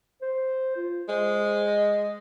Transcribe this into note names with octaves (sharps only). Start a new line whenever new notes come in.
C5
F4
G#3 C5
D#5